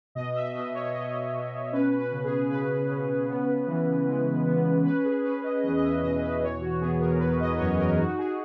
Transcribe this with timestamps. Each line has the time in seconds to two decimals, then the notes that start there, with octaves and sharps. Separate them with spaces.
0.15 B2 D#5
0.35 E5
0.55 B2 D#5
0.74 C#5
0.94 B2 D#5
1.32 B2
1.72 C#4 B4
1.98 B4
2.11 C#3
2.24 G#4
2.50 C#3 B4
2.90 C#4
3.28 B3
3.67 E3
4.07 G#3
4.46 B3
4.85 C#4 B4
5.04 G#4
5.24 C#4 B4
5.44 D#5
5.63 E2 D#5
5.77 D#5
5.83 E5
6.02 B2 D#5
6.22 B4
6.42 E3 C#5
6.61 F#4
6.81 B3 G#4
7.01 A#4
7.19 B3 B4
7.40 D#5
7.58 F#2 C#5
7.79 A#4
7.98 D#4 F#4
8.18 G#4